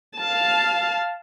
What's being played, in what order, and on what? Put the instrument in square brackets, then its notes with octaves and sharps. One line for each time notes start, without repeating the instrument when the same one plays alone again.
[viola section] F5 A5